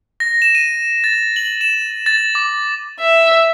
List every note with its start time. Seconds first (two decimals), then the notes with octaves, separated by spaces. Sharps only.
0.20 A#6
0.42 E7
0.55 D#7
1.04 A6
1.36 F#7
1.61 E7
2.06 A6
2.35 D6
3.00 E5